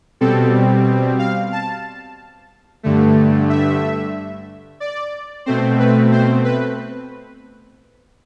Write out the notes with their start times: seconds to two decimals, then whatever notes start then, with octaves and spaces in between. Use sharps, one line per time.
0.21 B2 G3 C4 A4
1.19 F5
1.52 A5
2.83 G2 D3 A3
3.49 E5
4.80 D5
5.46 B2 A3 C4 C5
5.79 B4
6.12 C5
6.44 B4